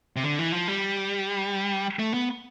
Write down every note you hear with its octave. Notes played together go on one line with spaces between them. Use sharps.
C3
D3
E3
F3
G3
A3
B3